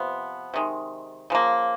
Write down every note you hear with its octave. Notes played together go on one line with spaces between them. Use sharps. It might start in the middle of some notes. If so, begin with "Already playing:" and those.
Already playing: C3 F3 B3
C3 D#3 G#3
C#3 F3 A#3